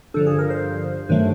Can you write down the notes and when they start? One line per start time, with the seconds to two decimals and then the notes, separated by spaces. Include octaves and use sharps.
0.14 G2 D3 F3 A4
0.26 G#4
0.39 A#4
0.50 C5
1.09 G2 D#3 F#3 A3